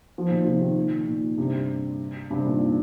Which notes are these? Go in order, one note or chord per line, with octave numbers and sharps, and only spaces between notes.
F3
A#2 D#3
C3 F3
A#2 D#3
A#2 D#3
G2 C3
G2 C3
A#2 D#3